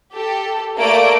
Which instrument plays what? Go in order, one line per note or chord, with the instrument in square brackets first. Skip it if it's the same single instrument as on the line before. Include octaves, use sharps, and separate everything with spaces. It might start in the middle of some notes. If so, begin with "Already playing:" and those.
[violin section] G4 A4
A3 A#3 D5 D7